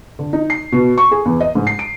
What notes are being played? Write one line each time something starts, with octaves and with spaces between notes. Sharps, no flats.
D3
D#4
C7
B2
C#6
G#4
E2
D#5
G#2
C7
D7